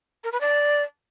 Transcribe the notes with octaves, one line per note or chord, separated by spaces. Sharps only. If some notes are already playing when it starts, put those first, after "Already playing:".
A#4
B4
D5